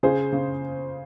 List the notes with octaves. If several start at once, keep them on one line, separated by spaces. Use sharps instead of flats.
C#3 G#4 C5
C#3